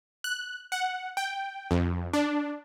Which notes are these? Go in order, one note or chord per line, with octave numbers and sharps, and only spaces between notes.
F#6
F#5
G5
F2
D4